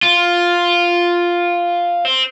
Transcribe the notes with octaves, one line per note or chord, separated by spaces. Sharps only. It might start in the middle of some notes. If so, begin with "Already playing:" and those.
F4
C4